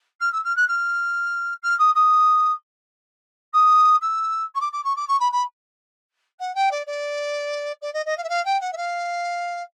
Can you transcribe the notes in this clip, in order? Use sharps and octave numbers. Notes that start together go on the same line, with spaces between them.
F6
E6
F6
F#6
F6
F6
D#6
D#6
D#6
E6
C#6
D6
D6
C#6
D6
C#6
B5
B5
F#5
G5
D5
D5
D5
D#5
D#5
F5
E5
F5
G5
F#5
E5
F5